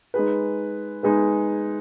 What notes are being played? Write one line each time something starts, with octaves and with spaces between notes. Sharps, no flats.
G#3 D#4 G#4 B4
G#3 D#4 G#4 B4